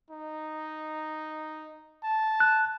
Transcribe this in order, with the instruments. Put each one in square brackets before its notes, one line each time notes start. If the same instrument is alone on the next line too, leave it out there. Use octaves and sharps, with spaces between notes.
[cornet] D#4
A5
[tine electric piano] F#6